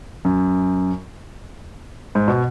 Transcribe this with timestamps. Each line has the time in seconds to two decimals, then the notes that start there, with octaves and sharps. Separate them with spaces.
0.25 F#2
2.15 G#2
2.28 B2